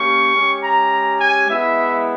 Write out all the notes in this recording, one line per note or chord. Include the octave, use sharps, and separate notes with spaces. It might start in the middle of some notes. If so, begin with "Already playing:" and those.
Already playing: A#3 C#4 G4 C#6
G#3 C#4 G4
A#5
G#5
G#3 B3 E4 E5